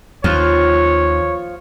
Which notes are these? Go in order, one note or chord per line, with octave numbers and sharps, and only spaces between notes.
D#2 F3 F4 C#5